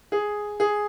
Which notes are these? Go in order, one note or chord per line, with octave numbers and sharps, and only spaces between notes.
G#4
G#4